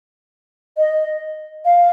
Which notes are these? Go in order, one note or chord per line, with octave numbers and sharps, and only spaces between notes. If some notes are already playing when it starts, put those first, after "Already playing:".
D#5
F5